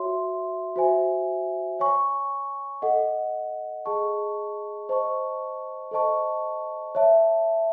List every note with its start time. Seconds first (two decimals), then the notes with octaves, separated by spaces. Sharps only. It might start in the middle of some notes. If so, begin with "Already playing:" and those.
Already playing: F#4 C#5 E5 C6
0.76 F#4 C5 E5 G#5
1.79 C#5 G#5 C#6
2.82 A4 D#5 F#5
3.86 G#4 D#5 A5 C#6
4.89 C5 D#5 A5 C#6
5.91 A4 C5 D#5 A5 C#6
6.95 C#5 E5 A5